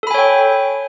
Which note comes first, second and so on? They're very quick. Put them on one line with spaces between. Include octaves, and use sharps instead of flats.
A4 B5 G#5 C#5 G5